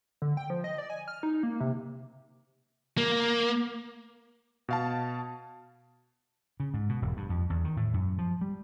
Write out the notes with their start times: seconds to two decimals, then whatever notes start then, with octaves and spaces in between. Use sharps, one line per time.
0.22 D3
0.37 G5
0.50 F3
0.64 D#5
0.78 D5
0.90 G#5
1.08 F6
1.23 D#4
1.43 A#3
1.60 C3
2.98 A#3
4.69 B2 F5 A5
6.60 C#3
6.74 G#2
6.89 B2
7.02 E1
7.17 G2
7.29 F2
7.50 E2
7.64 D#3
7.77 A2
7.94 F#2
8.18 F3
8.41 G3